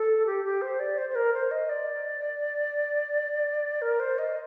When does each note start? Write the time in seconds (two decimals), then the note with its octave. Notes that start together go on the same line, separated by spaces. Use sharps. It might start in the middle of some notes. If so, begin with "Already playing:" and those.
Already playing: A4
0.26 G4
0.44 G4
0.61 C5
0.79 D5
0.98 C5
1.09 C5
1.15 A#4
1.33 C5
1.51 D#5
1.69 D5
3.81 A#4
4.00 C5
4.18 D#5